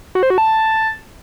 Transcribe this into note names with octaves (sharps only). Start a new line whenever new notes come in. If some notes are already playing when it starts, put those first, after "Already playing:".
F#4
C5
F#4
A5